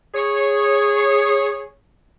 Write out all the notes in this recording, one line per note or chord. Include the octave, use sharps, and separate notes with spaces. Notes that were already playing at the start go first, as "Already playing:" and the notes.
G#4 C#5